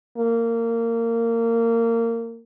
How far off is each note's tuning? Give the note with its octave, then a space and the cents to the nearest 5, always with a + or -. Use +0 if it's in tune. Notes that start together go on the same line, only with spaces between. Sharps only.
A#3 -20